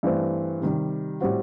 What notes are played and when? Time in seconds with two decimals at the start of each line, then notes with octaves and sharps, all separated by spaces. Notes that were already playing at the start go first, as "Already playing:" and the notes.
0.03 G2 E3 A3 C4
0.61 C3 D#3 G3
1.21 A2 G3 C4 F#4